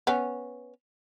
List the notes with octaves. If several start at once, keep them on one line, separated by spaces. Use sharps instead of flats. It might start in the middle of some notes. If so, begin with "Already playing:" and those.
B3 C#4